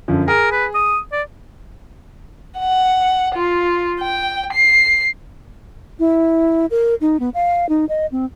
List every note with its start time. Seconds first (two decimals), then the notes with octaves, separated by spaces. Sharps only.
0.08 F#2 D3 F3
0.28 G#4 A#4
0.52 B4
0.74 D#6
1.12 D5
2.60 F#5
3.36 F4
4.01 G5
4.53 C7
5.99 E4
6.71 A#4
7.01 D#4
7.20 B3
7.34 F5
7.69 D#4
7.89 D#5
8.12 C4